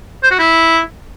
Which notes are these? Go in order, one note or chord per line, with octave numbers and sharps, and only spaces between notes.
C5
F#4
E4